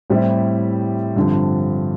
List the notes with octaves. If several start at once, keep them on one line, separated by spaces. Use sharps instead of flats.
A2 G3 C4 E4 G4
G2 D3 F3 C4